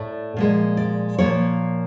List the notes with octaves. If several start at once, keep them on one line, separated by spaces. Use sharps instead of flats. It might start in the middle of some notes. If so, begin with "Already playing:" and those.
Already playing: A2 A3 D5
A#2 F3 G#3
D5
A#2 F3 A#3 C#5